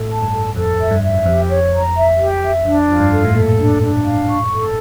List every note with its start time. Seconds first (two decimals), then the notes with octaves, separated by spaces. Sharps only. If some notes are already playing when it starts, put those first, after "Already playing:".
Already playing: A2 A4
0.10 A5
0.22 G2
0.32 A4
0.56 F2 A4
0.79 E5
0.91 G2
1.02 E5
1.17 G2
1.26 F2 G4
1.49 C#5
1.73 A#5
1.95 E5
2.19 G4
2.42 E5
2.65 F2 D4
2.88 F2 F4
3.00 G2
3.12 A4
3.25 A2
3.34 A#2 A4
3.58 D4
3.82 D4
4.05 F5
4.28 C#6
4.51 A4